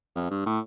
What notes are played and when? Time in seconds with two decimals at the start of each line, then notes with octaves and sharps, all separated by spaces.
0.15 F2
0.30 G2
0.46 A2